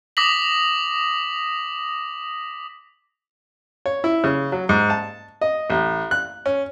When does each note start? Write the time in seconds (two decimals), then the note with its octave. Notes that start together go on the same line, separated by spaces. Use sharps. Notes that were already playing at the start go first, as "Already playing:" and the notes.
0.17 D6 D#6 A#6 B6 F#7
3.86 C#5
4.04 E4
4.24 C#3
4.52 F#3
4.69 G#2
4.90 A5
5.42 D#5
5.70 A1
6.11 F#6
6.46 C#4